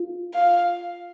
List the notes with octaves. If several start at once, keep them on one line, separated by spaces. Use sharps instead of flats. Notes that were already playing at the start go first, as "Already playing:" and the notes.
Already playing: F4
F5